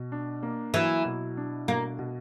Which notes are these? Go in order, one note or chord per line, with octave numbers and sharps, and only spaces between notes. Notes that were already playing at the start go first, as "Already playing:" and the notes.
Already playing: B2
D4
A#3
E3 F#3
B2
D4
B2 A#3
B2